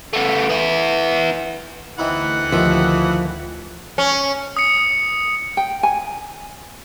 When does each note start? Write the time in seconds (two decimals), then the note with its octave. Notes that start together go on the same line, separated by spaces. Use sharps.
0.13 A3 B3
0.50 B3 E4
1.99 D2 E3 C4 D#4 E4 F#5
2.52 D#3 F3 G4 E5
3.98 C#4
4.57 D#6 C#7
5.57 G5
5.83 G#5